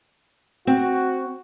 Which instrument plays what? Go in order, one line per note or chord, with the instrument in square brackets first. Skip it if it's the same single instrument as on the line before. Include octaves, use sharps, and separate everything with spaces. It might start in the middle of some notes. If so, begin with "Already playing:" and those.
[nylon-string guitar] C4 [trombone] F#4